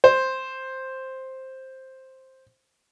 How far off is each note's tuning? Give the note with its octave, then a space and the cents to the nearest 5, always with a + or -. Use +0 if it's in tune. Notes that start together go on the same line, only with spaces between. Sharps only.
C5 +5